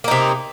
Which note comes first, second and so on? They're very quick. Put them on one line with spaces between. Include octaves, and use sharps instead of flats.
A#3 D#4 C3